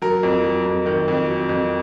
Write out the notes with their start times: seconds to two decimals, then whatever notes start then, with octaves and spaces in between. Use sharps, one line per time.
0.02 F#3 A#4
0.23 F2
0.44 F#3
0.66 F2
0.86 D#3
1.08 F2
1.28 F#3
1.49 F2